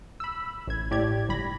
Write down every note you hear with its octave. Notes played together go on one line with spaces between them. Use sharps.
B5 E6
A1 G#6
A2 G4 D5 G#6
G1 G3 B5 A#6